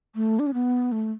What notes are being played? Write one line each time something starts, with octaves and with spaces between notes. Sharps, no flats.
A3
D4
C#4
B3
A3